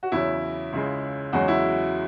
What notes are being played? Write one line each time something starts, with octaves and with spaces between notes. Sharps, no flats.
F#4
E2 C#3 F#3 C#4 E4
C#2 C#3 G#3
E2 C#3 F#3 G#3 F#4
E4